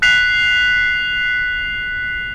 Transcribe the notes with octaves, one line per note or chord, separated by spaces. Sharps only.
F#6 B6 C7 F7